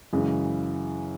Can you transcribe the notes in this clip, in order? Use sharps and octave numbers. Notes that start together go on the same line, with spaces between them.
F#2 C#3 E3 G#3